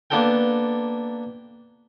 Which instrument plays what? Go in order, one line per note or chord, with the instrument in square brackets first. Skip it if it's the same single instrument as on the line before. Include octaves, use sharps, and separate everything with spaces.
[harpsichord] A#3 B3 D4 A4 A#4 G5